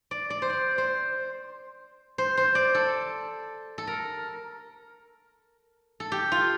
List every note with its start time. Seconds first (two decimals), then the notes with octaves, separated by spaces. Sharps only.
0.11 D5
0.30 D5
0.42 C5
0.50 D5
0.78 C5
2.18 C5
2.37 C5
2.55 D5
2.75 A4
3.78 A4
3.87 A#4
6.00 A4
6.12 G4
6.32 F4